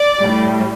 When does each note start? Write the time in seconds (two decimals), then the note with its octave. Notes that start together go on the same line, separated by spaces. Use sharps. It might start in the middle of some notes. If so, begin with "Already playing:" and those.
Already playing: D5
0.21 A2 G3